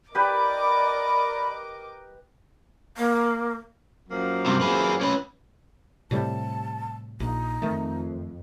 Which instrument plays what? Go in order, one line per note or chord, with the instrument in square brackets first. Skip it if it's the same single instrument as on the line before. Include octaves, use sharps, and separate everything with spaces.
[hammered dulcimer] G4 B4 [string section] A#4 D#5 D6 [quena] D5 [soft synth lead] B5
[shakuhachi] A#3
[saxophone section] F#2 F3 A#3
[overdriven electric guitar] G2 C3
G#4 B4
C#4 B4
[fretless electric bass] A2 C3 G3 [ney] A5
[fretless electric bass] A#1 [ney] D#4
[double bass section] F2 [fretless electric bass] D#3 A3